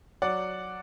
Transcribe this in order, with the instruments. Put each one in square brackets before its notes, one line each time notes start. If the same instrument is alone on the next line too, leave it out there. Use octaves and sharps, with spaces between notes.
[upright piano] F#3 D5 F#5